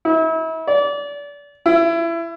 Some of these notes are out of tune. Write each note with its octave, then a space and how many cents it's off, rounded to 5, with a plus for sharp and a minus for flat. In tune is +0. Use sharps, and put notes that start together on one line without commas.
E4 -35
D5 -30
E4 +25